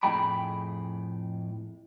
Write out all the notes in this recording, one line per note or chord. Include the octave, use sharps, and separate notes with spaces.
F2 A2 A3 G#4 G5 B5